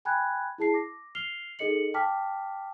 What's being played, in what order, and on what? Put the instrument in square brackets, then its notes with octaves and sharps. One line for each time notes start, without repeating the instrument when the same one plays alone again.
[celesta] G5 G#5 B5 F#6 G#6
E4 G#4 A5 C7
D6 A#6
F6 C7 F7 G7
D#4 G#4 A4 D#5 C#7 F#7
G5 A5 D6 F6 B6